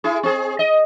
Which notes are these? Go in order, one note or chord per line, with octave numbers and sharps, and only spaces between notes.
E4 G#4
C4 G#4
D#5